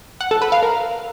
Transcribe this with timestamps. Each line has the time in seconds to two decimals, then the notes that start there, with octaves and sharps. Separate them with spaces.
0.21 F#5
0.31 A4
0.42 B4
0.52 F5
0.63 A#4